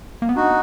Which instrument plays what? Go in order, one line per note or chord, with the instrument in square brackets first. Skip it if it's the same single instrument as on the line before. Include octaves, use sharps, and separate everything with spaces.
[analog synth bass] A#3
B3
[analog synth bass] D4 [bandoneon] D#4 F#4